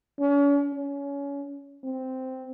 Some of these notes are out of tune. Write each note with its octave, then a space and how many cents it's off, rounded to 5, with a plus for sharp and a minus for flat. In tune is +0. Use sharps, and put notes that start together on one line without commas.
C#4 +40
C#4 +25
C4 -10